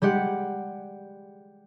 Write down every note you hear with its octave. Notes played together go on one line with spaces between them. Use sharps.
G3 G#3 G4 F#5